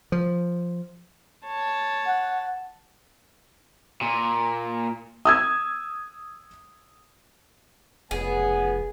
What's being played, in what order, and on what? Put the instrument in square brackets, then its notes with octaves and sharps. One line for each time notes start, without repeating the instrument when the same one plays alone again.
[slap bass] F3
[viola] C#5 A5
[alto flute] F#5
[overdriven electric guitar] A#2
[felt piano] D#6 E6 G#6
[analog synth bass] F1 [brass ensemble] C#2 B3 G#5 [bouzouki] G#4